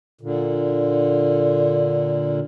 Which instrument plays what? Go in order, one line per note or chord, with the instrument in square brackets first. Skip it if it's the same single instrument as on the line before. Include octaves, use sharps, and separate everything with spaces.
[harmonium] A#2 D3